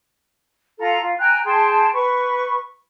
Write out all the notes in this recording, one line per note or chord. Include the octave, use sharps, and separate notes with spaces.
F4 A4 A#5
F4
G5 G#5 A#5 F#6
G#4 G5 A5 C6
B4 C#6